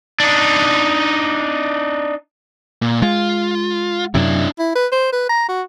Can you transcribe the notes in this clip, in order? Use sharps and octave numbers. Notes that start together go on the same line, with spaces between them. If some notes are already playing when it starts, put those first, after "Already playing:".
D4 D#4
A#2
G#3 F4
F#2 C3 D4 E4
E4
B4
C5
B4
A#5
F#4